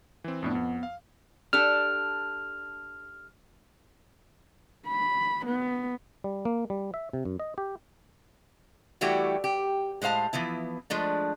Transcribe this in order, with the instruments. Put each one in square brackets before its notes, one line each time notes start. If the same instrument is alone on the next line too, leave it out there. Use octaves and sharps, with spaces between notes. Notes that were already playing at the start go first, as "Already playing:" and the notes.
[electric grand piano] E3 C4
[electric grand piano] F2 A2 D4 [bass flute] B3
[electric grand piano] F2
F5
[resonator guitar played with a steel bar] D4 G4 A4 [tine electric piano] F6
[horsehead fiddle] B5
B3
[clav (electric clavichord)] G3
A#3
G3
E5
C3
F#2
D#5
G4
[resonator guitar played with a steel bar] E3 G3 A3 E4 F#4 G4
G4
A2 G#3 C5 F5 A5
E3 F3 B3 E4
F3 G#3 A3 D4